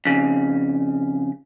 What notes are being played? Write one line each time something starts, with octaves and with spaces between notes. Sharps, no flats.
F2 C#3